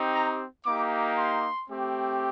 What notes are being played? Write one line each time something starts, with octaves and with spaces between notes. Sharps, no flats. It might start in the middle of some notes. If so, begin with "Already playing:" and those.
Already playing: C4 D#4 G4
A#5
A#3 D#4 G4 D6
C6
A3 C4 G4